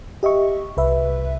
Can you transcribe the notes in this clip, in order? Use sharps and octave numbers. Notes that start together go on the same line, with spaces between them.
G4 D#5 E5 C#6
C2 B4 E5